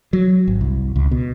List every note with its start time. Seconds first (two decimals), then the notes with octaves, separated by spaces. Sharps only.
0.13 F#3
0.47 G#1
0.61 C2
0.96 C#2
1.11 B2